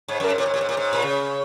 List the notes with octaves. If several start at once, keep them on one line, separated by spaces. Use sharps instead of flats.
G#2 C#5
F#2 A#4
G#2
A#2 C#5
G#2
A#2
G#2
A#2
G#2
A#2
C#3